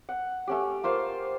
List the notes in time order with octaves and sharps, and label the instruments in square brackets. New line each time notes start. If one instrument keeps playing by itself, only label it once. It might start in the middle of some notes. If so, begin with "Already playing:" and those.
[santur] F#5
A3 C#4 G4
A#3 F4 C5 F5